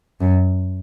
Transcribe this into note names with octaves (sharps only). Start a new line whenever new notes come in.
F#2